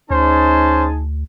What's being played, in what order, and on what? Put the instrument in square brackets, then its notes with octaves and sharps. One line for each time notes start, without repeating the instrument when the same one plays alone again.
[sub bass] D2 [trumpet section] C#4 C5 [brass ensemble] D#4 G#4 A5